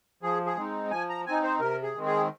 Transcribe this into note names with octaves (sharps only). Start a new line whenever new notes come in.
F3 G#4
G#4
G#3 C4 D#4
F3 G#5
A#5
C4 D#4 G#5
C5
C3 A#4
G#4
D#3 G#3 C4
G#4